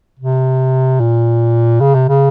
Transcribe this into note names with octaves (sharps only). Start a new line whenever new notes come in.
C3
A#2
C#3
C3
C#3